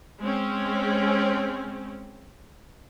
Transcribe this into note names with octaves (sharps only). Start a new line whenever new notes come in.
G#3 C4 C#4